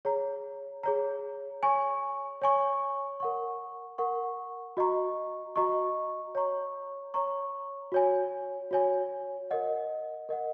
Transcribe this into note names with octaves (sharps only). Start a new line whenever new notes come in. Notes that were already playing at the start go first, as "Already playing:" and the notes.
G#4 C#5 A#5
G#4 C#5 A#5
C#5 G#5 C#6
C#5 G#5 C#6
A#4 F#5 C#6
A#4 F#5 C#6
F#4 D#5 A#5 C#6
F#4 D#5 A#5 C#6
C#5 A#5 C#6
C#5 A#5 C#6
F#4 C#5 G#5
F#4 C#5 G#5
A#4 D#5 F#5
A#4 D#5 F#5